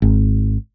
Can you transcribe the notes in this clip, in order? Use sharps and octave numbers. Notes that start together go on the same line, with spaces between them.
G#1